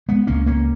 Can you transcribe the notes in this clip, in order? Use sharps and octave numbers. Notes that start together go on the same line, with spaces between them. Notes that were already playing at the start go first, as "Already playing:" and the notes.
G#3 B3
C#2 A#3 C#4
A#3 C#4